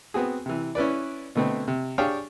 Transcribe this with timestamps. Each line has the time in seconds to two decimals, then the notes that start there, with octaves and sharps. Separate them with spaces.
0.14 B3 C4 F#4 G#4
0.46 C3 E3
0.75 C#4 E4 B4 D5
1.35 B2 D3 A3 B3 C4
1.68 C3
1.98 D4 G4 G#4 C#5 F5 G5